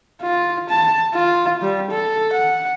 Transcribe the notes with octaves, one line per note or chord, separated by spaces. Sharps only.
F4
A5
F4
G3
A4
F#5